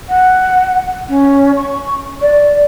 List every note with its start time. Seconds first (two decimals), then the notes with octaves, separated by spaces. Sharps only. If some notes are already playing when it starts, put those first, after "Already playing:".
0.09 F#5
1.09 C#4
1.56 C#6
2.21 D5